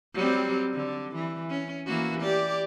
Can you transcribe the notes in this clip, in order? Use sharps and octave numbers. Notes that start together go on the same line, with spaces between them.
F#3 G3 C4
D3
E3
C#4
E3 A#3 F#4
G4 D5